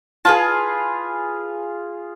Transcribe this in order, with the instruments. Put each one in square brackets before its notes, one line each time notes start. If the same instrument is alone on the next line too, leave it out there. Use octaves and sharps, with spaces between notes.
[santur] F4 G#4 [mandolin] B4 A5